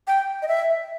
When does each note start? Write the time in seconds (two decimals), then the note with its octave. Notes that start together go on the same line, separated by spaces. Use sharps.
0.07 G5
0.42 D#5
0.48 E5